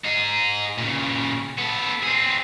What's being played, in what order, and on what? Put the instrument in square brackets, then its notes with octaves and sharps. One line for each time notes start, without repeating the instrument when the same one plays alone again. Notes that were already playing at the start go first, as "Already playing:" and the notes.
[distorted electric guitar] D#4 G#4
A#2 C#3
B3 A4
C4 G#4